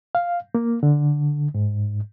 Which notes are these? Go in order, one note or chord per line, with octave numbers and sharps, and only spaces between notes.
F5
A#3
D3
G#2